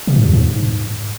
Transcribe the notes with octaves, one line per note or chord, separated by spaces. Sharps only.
C3
G#2
E2
G#2